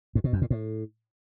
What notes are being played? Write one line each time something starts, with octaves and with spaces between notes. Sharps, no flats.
G2
B2
F#2
A#2
A2